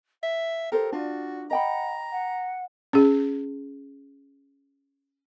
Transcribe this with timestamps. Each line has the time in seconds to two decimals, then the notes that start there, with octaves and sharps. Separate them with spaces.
0.23 E5 F5
0.72 G4 A4 A#4 C5
0.92 D4 F4 F#4 D5
1.51 D#5 F#5 G5 A#5 B5
2.11 F#5
2.93 C#4 G#4